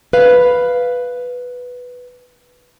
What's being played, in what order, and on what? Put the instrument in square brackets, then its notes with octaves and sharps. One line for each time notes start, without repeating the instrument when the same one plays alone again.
[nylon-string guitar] B4 F5